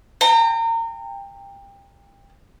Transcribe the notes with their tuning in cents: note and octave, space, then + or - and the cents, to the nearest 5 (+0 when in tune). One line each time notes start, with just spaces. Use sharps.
G5 +25 A#5 -30